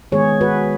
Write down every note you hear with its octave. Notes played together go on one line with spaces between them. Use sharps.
D#3 G#3 B3 G#4 C#5
F#4 B4